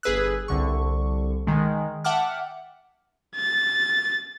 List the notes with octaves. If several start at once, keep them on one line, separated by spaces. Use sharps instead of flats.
G1 G#4 B4 E6 F#6
C2 D3 C#6
D#3 G#3
E5 F#5 G5 A5 D6 F6
A6